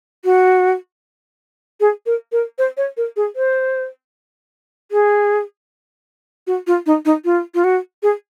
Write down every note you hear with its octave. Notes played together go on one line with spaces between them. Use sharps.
F#4
G#4
A#4
A#4
C5
C#5
A#4
G#4
C5
G#4
F#4
F4
D#4
D#4
F4
F4
F#4
G#4